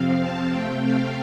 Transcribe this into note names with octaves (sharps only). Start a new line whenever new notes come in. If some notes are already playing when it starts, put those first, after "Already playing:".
Already playing: F2 C3 F3 C4 F5
A5
C3 A3 C4 G5
F5